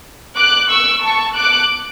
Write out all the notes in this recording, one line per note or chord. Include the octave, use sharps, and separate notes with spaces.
D6 F#6
C#6 E6
A5 C#6
D6 F#6